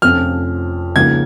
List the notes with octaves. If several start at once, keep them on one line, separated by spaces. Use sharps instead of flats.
F1 F2 F3 C#4 F4 F6
C#2 C#3 F3 A#3 D#4 G#6